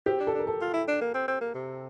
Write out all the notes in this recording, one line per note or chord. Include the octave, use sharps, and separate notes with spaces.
C4 G4
D4
A4
D4
A#4
A4
F4
E4
D4
A#3
C4
C4
A#3
C3